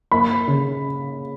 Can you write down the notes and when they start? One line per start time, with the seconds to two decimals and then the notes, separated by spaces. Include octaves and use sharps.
0.12 A#3 B5
0.47 C#3